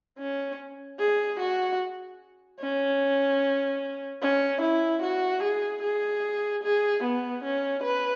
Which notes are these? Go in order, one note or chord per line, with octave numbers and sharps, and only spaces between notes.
C#4
G#4
F#4
C#4
C#4
E4
F#4
G#4
G#4
G#4
B3
C#4
B4